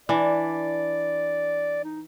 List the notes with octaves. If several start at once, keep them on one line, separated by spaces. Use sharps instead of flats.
E3 D4 D5
D#4